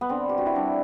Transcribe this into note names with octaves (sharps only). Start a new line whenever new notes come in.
B3
D3 C4
G4
F#4
E4
G3 D4